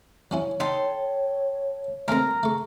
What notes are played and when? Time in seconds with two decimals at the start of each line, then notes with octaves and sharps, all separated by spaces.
0.31 F#3 C#4 E4 C#5
0.60 D#4 A4 G5 C6
2.08 G#3 A3 C4 A#4 A#5
2.43 A3 G#4 C#6